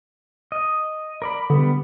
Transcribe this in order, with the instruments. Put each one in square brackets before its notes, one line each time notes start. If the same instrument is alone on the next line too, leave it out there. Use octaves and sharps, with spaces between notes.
[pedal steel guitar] D#5
A#4 D5 B5
[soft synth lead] D3 [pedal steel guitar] G3 B3